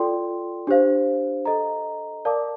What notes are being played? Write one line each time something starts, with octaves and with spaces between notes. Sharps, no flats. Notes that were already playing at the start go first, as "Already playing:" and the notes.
Already playing: F4 A4 D5 G5 C6
D4 G4 C5 F5
A4 D#5 A#5
A#4 D5 F5 A5 D6